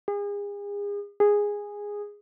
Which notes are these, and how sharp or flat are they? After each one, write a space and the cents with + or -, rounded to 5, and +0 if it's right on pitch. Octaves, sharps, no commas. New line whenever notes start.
G#4 -35
G#4 -10